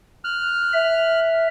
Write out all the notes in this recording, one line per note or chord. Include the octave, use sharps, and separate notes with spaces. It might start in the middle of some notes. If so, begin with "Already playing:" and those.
F6 F#6
E5